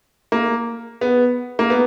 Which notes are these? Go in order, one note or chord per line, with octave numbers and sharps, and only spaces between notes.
A#3
B3
A#3
B3